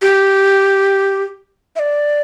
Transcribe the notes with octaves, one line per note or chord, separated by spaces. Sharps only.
G4
E5
D5